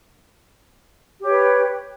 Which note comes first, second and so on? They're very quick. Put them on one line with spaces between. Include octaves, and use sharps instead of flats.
G4 C#5 B4